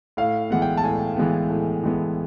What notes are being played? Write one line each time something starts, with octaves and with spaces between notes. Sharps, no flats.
A2 F5
E3 G#3 B3 F#5
G5
A5
A2 G#5
E3 G#3 B3
A2
E3 G#3 B3